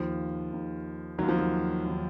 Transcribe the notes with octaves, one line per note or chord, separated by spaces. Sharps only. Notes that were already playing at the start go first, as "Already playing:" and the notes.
Already playing: D#2 D#3 F3
D#2 D#3
D#2 D#3 F#3
F3
F#3
D#2 D#3